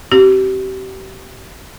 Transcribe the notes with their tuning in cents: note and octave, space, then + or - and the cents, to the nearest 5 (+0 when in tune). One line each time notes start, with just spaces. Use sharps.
C4 +25 G4 -35